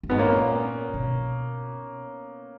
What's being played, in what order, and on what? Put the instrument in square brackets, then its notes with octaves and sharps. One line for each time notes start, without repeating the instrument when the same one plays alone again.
[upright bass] F#2
[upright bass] G#2 [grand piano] B3
[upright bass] A#2 [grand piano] A#3 C#4
[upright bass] B2